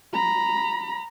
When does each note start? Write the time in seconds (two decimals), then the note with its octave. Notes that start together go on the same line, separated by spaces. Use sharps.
0.13 A#5 B5